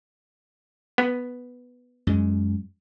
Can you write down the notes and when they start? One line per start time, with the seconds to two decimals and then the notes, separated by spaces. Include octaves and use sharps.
0.98 B3
2.07 F#2 G#3